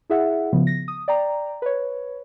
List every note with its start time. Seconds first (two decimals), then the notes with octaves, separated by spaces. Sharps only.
0.10 E4 G#4 E5 F#5
0.53 C#3 F3 B3
0.67 A#6
0.88 D#6
1.08 D5 G5 A#5
1.62 B4 C#5